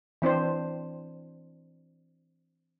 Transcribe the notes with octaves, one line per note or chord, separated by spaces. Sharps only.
E3 C4 D4 C5